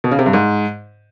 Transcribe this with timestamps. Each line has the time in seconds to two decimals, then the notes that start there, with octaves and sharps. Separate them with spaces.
0.04 B2
0.11 C#3
0.19 C3
0.26 G2
0.33 G#2